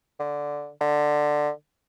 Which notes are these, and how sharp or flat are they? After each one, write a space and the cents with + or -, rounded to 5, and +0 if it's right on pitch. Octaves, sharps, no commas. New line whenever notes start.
D3 -5
D3 +10